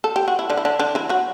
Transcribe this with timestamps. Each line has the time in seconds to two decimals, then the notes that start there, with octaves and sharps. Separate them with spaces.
0.04 A4
0.16 G4
0.28 F#4
0.39 E4
0.50 D3 D4
0.57 E4
0.65 D3 D4
0.79 D3 D4
0.95 E3 E4
1.09 F#3 F#4